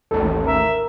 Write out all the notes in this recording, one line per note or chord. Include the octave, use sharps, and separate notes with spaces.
A1 D#2 A4
A#4 E5